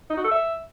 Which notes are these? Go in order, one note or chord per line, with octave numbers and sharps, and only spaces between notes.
D#4
F#4
A4
E5